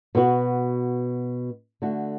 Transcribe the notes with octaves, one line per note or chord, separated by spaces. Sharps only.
B2 B3 F#4
D3 A3 F#4